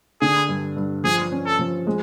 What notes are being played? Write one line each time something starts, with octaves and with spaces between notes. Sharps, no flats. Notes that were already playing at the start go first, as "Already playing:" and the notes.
D3 G#4
G2
G2
F3 G#4
C#4
A4
F3
G#3